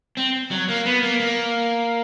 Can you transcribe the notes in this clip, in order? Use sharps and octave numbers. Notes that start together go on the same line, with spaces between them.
C4
F#3
A#3
B3
A#3
A#3